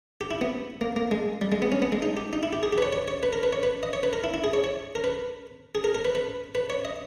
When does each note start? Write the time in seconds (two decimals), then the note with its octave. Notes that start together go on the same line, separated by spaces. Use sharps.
0.21 G4
0.31 E4
0.41 B3
0.81 A#3
0.96 A#3
1.11 G#3
1.41 G3
1.52 G#3
1.62 B3
1.72 C#4
1.82 B3
1.92 G#3
2.02 D#4
2.17 G4
2.33 D#4
2.43 E4
2.53 G4
2.63 G#4
2.73 G4
2.78 B4
2.82 C#5
2.93 C#5
3.08 C#5
3.23 B4
3.33 A#4
3.43 B4
3.53 C#5
3.63 B4
3.83 D#5
3.93 C#5
4.03 B4
4.13 A#4
4.24 E4
4.34 E4
4.44 G#4
4.53 C#5
4.64 C#5
4.95 A#4
5.04 B4
5.75 G#4
5.84 A#4
5.95 A#4
6.05 B4
6.15 B4
6.55 B4
6.70 C#5
6.85 D#5